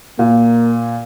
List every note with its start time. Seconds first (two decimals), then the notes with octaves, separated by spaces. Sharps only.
0.19 A#2 A#3